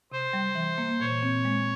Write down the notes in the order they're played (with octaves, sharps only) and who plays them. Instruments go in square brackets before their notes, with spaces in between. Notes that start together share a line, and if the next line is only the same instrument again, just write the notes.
[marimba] C3 [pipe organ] C5
[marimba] G3
E3
A#3
[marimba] A#2 [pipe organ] C#5
[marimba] C4
G#3